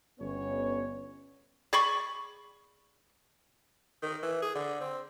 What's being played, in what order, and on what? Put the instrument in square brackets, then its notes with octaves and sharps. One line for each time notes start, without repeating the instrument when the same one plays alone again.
[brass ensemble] G1 B3 C#4 C#5
[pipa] G#4 D5 B5 C#6
[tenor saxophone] D#3
E3
G#4
D3
C4